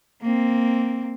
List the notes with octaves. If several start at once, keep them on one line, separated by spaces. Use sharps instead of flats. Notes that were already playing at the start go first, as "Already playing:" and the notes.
A#3 C4